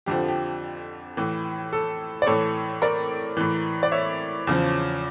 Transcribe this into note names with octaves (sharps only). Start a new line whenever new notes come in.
F2 D3 F3 G4
G4
A2 E3
A4
D5
A2 E3 A4 C#5
A#4 D5
A2 E3
D5
C#5 E5
E2 C#3 F3